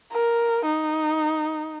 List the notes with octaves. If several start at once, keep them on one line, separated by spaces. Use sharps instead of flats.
A#4
D#4